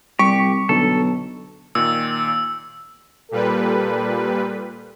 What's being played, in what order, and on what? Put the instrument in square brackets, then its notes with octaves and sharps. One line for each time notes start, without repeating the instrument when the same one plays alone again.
[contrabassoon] C2 [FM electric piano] G3 [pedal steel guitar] G4 [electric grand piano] C#6
[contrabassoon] B1 [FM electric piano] D3 [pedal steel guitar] A4
[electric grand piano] A#2 D#3 [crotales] E6
[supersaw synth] A#2 G3 B4 [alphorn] A4